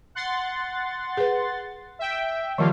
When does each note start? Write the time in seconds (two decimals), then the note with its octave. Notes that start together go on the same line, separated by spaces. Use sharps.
0.15 F#5 C6 A6
1.17 G#4 B4
1.99 E5 G5
2.58 D#3 F3 G3 A#3 F4 A5